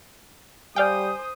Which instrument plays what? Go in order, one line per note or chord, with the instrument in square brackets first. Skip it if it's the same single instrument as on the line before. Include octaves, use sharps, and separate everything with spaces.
[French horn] G3 [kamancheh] C5 D#6 [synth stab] D5 F5 G5 [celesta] G#5 G6